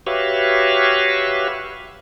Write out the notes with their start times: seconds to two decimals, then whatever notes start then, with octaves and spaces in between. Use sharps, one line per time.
0.07 F#4 G4 B4 C#5 E5 F5